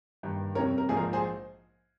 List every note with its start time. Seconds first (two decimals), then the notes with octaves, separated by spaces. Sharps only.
0.23 G2 D#3 A#3
0.55 F2 C3 G3 A#3 A#4 C#5
0.78 A#4
0.89 A#1 G#2 F3 A#3 G#4
0.97 A#4
1.13 G#4 C5